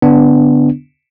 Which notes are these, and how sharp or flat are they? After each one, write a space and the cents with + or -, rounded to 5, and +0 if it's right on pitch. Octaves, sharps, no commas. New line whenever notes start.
D3 -25 B3 +10 D4 +0